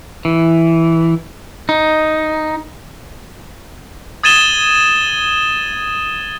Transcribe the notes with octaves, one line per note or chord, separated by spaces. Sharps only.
E3
D#4
D#6 G#6 A6 D#7 E7 G7